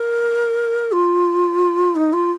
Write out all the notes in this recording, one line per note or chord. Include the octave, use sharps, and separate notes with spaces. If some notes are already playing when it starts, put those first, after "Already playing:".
Already playing: A#4
F4
D#4
F4